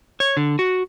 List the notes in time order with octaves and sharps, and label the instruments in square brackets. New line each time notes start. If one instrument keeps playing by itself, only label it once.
[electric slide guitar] C#5
D3
F#4